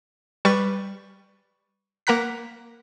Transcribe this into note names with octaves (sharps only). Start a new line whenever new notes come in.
G3 B4 C#6 A6
A#3 A#4 F#5 A#5 F#6 B6